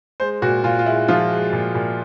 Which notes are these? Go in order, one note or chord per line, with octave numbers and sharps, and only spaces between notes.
G#3 C5
A#2 F#4
A#2 F4
F4
G#3 E4
F3 F4
G#3
A#2
A#2